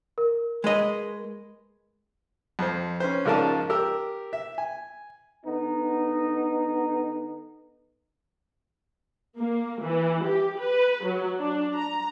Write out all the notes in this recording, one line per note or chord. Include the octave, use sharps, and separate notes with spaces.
A#4
G#3 B4 D#5
F2 C5
C#4 B4 C5
G#2 C#3 F3 A#4 D5 A5
G4 A#4 E6
E5
G#5
D3 B3 D#4
A#3
E3
G4
B4
F#3
D4
A#5